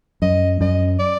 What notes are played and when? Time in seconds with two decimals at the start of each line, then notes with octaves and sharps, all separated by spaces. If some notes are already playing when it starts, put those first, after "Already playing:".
0.22 F#2 D#5
0.61 F#2 D#5
0.99 D5